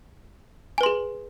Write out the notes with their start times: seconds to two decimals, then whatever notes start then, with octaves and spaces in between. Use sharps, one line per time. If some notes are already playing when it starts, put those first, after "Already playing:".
0.78 G#5
0.81 B4
0.83 C6
0.86 G#4